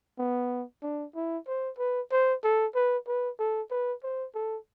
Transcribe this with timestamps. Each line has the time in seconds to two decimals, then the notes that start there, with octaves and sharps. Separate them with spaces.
0.19 B3
0.82 D4
1.15 E4
1.47 C5
1.79 B4
2.11 C5
2.44 A4
2.75 B4
3.07 B4
3.39 A4
3.71 B4
4.03 C5
4.35 A4